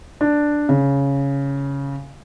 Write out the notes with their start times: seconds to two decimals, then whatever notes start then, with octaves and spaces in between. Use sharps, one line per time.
0.21 D4
0.69 C#3